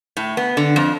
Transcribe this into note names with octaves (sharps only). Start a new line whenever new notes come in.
A2
B3
D3
F2